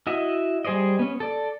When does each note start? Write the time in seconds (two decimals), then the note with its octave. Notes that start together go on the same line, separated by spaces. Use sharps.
0.07 E4 F#4 D#5 E5
0.65 G3 G#4 C5 D5 D#5
0.99 B3 C#4
1.20 A4 D5